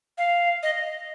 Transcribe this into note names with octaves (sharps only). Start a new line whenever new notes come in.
F5
D#5